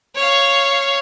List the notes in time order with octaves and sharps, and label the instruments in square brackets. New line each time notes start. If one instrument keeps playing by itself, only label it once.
[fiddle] C#5 F5